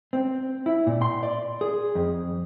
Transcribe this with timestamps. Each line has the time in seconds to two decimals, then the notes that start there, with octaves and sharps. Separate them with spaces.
0.13 C4
0.66 E4
0.87 A#2
1.02 C6
1.23 D5
1.61 G#4
1.95 F2